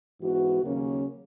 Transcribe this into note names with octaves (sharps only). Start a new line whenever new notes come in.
G#2 E3 B3 F#4
D#2 C#3 F#3 A#3 C#4